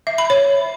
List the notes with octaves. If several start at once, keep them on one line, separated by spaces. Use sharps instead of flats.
E5
B5
C#5